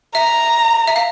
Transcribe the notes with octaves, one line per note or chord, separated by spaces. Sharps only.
E5 A#5
E5
F5